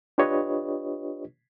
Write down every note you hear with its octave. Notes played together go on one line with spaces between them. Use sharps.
D4 F4 G4 B4 C#5 D#5